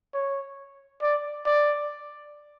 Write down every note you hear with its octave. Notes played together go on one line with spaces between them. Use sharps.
C#5
D5
D5